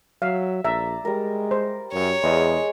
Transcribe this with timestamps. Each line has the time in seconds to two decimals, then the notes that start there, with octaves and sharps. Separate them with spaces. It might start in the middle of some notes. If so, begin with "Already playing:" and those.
0.22 F#3 E5 F5
0.65 A#1 D5 E5 A#5
1.05 G3 G#3 A#4
1.51 C5
1.93 F#2 C#5
2.23 E2 G#3 G#4